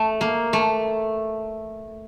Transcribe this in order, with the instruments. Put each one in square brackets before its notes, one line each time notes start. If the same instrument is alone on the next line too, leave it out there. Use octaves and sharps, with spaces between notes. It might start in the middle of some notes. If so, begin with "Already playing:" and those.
Already playing: [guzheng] A3
A#3
A3